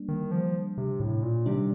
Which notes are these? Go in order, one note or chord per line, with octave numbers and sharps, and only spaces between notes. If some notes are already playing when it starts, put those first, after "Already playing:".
Already playing: G3 A#3 D4
D#3
F3
C3
A2
A#2
C3 D#3 G3 D4